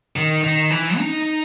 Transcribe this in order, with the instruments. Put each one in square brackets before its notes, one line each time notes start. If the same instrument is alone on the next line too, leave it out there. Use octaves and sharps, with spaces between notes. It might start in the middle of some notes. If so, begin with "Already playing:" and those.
[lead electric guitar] D#3
D#3
E3
D#4